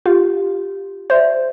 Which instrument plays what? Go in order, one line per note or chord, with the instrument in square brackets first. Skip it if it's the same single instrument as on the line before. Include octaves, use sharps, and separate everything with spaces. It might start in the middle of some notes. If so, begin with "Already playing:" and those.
[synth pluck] F4 [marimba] G4
[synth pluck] C5 [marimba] D5 E5 G6